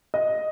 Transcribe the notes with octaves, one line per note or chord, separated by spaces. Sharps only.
D#5